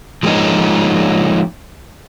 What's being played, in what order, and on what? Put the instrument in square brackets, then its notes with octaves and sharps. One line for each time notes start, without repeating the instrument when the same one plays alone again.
[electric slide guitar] F3 G#3 A#3 C#4 D#4